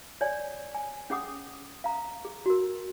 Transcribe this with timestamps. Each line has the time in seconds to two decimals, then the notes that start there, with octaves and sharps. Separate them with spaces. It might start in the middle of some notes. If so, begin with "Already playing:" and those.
0.21 C#5 D5 G#5
0.75 G#5
1.10 C#4 G#4 F#5 D6 D#6
1.84 F5 A#5
2.25 G#4
2.46 F#4 A#4